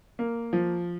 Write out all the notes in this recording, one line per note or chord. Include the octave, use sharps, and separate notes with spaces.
A#3
F3